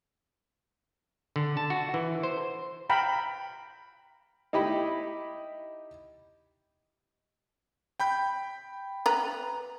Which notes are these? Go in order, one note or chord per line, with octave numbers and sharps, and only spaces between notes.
D3
A5
F#4
E3
C5
F5 G5 A#5 B5
D#4 E4 G4 D#5 B5
G5 B5 G6
B4 A#5